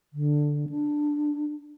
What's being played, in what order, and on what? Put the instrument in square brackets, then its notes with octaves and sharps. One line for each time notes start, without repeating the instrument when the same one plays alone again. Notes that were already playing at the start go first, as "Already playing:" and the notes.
[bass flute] D3
D4